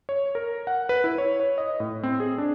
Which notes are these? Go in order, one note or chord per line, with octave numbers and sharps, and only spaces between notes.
C#5
A#4
F#5
B4
E4
C#5
C#5
D#5
A2
C4
G#4
D4